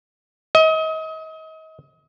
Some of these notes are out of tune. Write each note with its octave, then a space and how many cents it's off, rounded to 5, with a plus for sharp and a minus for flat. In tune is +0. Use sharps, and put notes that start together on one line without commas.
D#5 +35